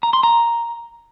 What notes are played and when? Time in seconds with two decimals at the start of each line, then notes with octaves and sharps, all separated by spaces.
0.03 A#5
0.13 C6
0.23 A#5